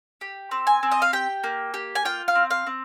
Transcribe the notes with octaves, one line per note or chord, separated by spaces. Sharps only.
G4
C4
G#5
C4
D#5
F5
G4 G5
A#3
G4
G#5
F4 G5
F5
C4
F5
C4